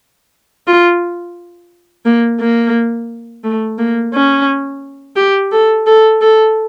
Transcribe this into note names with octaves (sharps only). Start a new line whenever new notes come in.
F4
A#3
A#3
A3
A#3
C#4
G4
A4
A4
A4